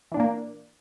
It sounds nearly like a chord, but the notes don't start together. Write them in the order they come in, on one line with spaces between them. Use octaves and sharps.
E3 D4 A#2 A#3